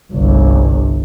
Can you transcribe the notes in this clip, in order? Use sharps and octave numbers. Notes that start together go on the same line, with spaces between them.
G1 C2